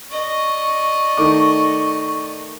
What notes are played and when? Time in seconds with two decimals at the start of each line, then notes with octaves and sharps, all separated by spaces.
0.11 D5 D#5 C#6
1.17 D#3 A3 D6